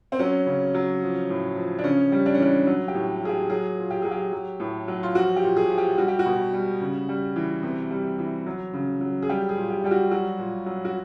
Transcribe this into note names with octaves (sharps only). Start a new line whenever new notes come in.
C4
F#3 C#4
C#3
F#3
F3
A2
F3
D4
C#3 C#4
G3
D4
C#4
E3 D4
F#3
G4
A2
F#3 G#4
G4
F#3 G#4
A#2
G4
F#3 G#4
G4
F#3
A2
F#3
F4
F3 F#4
G4
A#2
G#4
F3
G4
G3 F#4
G4
F#4
B2
G3
C#3
G3
E3
C3
G3
E3
F#3
C#3
F#3
G#4
G3 G4
G#4
A#2
G4
G3 G4
F#4
F#3 F#4
A#2
F#3
F#4